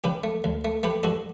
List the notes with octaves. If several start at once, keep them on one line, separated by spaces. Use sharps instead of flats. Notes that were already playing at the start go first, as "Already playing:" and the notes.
C#3 G4 B4
A3
D2
A3
A3 G4 B4
G2 F#4 A4